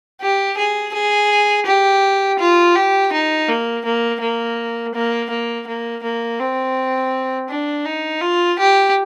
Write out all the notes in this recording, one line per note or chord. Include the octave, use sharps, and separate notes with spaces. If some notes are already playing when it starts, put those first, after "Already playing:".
G4
G#4
G#4
G4
F4
G4
D#4
A#3
A#3
A#3
A#3
A#3
A#3
A#3
C4
D4
D#4
F4
G4